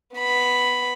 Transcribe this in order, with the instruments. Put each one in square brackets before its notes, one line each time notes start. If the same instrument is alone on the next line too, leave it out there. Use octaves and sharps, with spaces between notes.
[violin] B3 B5